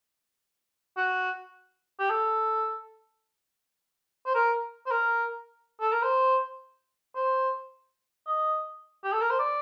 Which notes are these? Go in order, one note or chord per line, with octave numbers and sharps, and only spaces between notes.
F#4
G4
A4
C5
A#4
C5
A#4
A4
A#4
C5
C5
D#5
G4
A4
A#4
C5
D5